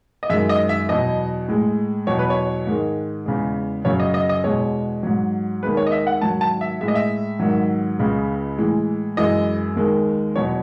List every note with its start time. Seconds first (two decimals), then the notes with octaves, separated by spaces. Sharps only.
0.23 D#5
0.30 F#2 D#3 G#3 E5
0.49 D#5
0.69 E5
0.89 E2 B2 F#3 D#5
1.48 A2 G#3
2.07 E2 B2 F#3 C#5
2.19 B4
2.30 C#5
2.67 G#2 D#3 G#3
3.26 E2 C#3 G#3
3.85 F#2 C#3 F#3 C#5
4.00 D#5
4.14 D#5
4.29 D#5
4.44 E2 B2 G#3 C#5
5.03 G#2 F#3
5.63 D#2 D#3 G#3 B4
5.77 C#5
5.87 D#5
5.92 E5
6.07 F#5
6.21 G#2 D#3 F#3 A5
6.41 A5
6.61 E5
6.81 A2 G#3 E5
6.88 D#5
6.95 E5
7.40 G#2 D#3 F#3
7.99 C#2 C#3 G#3
8.58 A2 E3 G#3
9.17 F#2 E3 G#3 D#5
9.76 D#2 D#3 G#3
10.36 E2 B2 F#3 C#5